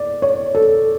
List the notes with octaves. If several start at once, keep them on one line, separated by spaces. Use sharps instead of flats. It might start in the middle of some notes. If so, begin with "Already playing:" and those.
Already playing: D5
C#5
A4